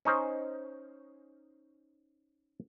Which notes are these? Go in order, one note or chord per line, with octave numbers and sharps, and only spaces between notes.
C#4 D#4 C5